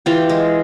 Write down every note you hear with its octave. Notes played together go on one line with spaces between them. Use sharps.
E3 F4 G4
G#3